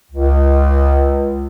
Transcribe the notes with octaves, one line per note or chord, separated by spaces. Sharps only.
C#2